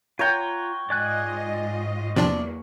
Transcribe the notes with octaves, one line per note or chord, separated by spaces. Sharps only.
F4 C#5 F#5 G5 A#5
G#2 F4 D5 D#5 G#5 F#6
E2 C3 F3 F#3 A#3 D4 D5